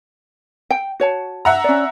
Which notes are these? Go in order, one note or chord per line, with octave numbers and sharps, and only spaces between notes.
G5
F#4 C#5 A5
E5 F#5 A#5
C#4 D5